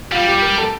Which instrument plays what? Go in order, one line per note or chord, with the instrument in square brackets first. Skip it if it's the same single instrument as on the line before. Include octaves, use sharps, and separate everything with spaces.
[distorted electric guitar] G3 [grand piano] F4
[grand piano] G4
A#4
A4